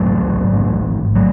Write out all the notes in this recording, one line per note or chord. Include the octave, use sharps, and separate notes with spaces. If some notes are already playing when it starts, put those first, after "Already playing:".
Already playing: A1 G#2 F#3 A3
A1 G#2
F#3 A3